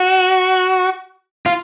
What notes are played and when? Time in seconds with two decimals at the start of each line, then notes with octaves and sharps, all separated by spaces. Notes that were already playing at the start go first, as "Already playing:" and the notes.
Already playing: F#4
1.46 F4